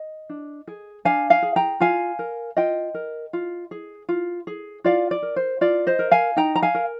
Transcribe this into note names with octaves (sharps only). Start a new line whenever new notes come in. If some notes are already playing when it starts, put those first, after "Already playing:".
Already playing: D#5
D4
G#4
D4 F5 G#5
F5 G#5
G#4
G5 A#5
F4 F5 G#5
A#4
F4 D#5 G5
A#4
F4
G#4
F4
G#4
F4 D5 F5
D5
A#4
C5
F4 D5
C5 D#5
A#4
F5 G#5
D#4 G5 A#5
A#5
F5 G#5
A#4